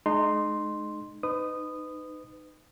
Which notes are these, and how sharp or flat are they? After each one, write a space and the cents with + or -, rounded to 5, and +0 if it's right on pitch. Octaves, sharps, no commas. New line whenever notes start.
G#3 +35 D#4 -25 C6 +0
D#4 -15 B4 +30 D#6 -10